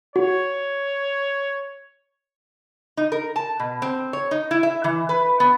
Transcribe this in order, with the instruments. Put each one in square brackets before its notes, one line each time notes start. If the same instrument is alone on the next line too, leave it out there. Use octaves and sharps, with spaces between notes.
[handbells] F#4 [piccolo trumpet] C#5
[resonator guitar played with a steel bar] D#4
A#4
A5
B2
C4
C#5
D#4
E4
E5
E3
B4
B3